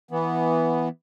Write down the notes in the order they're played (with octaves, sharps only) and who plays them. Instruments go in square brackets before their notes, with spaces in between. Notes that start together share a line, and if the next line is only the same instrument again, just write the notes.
[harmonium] E3 B3